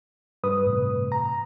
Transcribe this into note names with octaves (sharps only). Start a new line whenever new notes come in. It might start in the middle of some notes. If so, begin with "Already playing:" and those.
G2 B4 D#6
A2 C3 E3
A#5